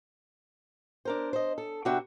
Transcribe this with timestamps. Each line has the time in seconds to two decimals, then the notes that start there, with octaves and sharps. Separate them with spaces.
1.05 D4 A#4 C5
1.33 C5 D#5
1.58 A4
1.85 C3 B3 D4 F#4 E5 G5